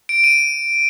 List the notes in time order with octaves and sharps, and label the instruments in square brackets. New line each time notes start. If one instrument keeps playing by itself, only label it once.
[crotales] D7
D#7